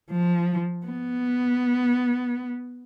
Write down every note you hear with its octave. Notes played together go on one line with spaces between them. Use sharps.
F3
B3